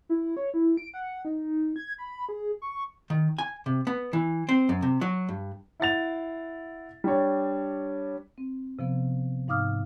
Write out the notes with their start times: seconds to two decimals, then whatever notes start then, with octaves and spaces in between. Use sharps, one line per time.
0.09 E4
0.37 C#5
0.54 E4
0.77 D7
0.94 F#5
1.25 D#4
1.76 G#6
1.98 B5
2.29 G#4
2.62 C#6
3.10 D#3
3.38 G#5
3.66 C3
3.87 B3
4.13 E3
4.49 C4
4.69 F#2
4.82 C3
5.01 F#3
5.29 G2
5.80 E4 F#5 A6 F7
7.04 G3 D4 C#5
8.38 C4
8.79 C3 F3 B3
9.48 G#2 D#4 F5 D6 D#6 F6